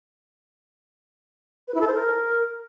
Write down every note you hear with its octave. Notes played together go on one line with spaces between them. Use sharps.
B4
E4
A4
C5
A#4